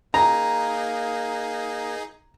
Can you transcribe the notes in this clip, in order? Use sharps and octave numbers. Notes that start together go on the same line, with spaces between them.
A#3 D#4 G#4 A#5